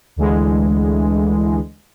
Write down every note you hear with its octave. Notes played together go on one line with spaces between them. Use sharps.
D2 D3 E3 G#3